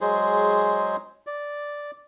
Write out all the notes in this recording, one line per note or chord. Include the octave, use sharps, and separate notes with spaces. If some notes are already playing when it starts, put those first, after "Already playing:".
F#3 G#3 G#4 C5
D5